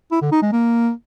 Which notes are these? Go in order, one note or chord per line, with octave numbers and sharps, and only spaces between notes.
E4
D3
D#4
G#3
A#3